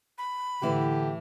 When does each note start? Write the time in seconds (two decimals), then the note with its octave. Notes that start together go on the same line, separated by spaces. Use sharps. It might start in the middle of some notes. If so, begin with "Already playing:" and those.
0.18 B5
0.62 A2 D3 E3 E4 G4